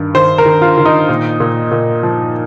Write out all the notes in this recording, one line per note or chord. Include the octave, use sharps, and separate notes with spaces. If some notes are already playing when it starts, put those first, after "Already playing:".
Already playing: G2 D#3
D#3 C5
A#4
D#3
F4
D#3
D#4
A#2
A#2
A#2
F3